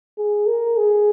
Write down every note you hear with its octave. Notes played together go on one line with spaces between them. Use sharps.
G#4
A#4
G#4